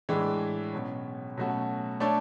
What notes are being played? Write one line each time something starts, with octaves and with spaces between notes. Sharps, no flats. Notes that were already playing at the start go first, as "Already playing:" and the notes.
A2 E3 G#3 D4
B2 F#3 C#4
B2 F#3 A3 C#4 F#4
A3 D4 A4 C#5